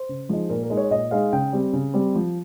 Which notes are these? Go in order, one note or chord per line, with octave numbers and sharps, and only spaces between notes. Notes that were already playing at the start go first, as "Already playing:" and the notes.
Already playing: C5
C#3
F3 G#3 D#4
A#2 A#4
A#4
G#3 D#4
C#5
A#2 D#5
G#3 D#4 F5
C#3 G5
G3 C4
C#3
G3 C4
F3